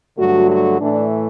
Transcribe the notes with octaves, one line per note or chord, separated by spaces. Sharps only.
G2 D3 F#3 A3 F#4
F#4
A2 E3 A3 D4